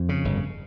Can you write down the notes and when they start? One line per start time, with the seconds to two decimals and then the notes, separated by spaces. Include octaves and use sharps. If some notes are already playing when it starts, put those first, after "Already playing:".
Already playing: F2
0.09 C#3
0.25 G1